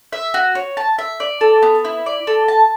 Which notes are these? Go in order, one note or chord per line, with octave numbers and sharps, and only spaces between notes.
E5
F#4
C#5
A5
E5
D5
A4
B3
E4
D5
A4
A5